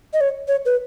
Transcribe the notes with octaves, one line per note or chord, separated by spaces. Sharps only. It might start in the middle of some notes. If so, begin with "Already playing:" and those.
D#5
C#5
C#5
B4